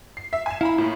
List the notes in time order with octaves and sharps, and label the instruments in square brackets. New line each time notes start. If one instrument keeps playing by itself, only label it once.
[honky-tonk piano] C7
E5
G#5 E7
[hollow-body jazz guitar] E4 [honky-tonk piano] F5 A#5 B5
[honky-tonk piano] A2 A#3